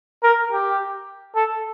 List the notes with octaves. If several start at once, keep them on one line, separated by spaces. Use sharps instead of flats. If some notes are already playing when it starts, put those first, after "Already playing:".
A#4
G4
A4